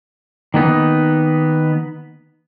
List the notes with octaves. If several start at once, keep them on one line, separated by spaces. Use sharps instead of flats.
D#3 A#3 B3 D#4